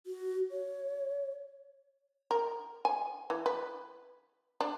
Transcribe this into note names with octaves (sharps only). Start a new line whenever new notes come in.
F#4
C#5
A#4
G#5
E3
B4
D4